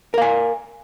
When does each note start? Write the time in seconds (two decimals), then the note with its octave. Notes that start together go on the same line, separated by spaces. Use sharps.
0.14 A#4
0.18 F5
0.22 G#5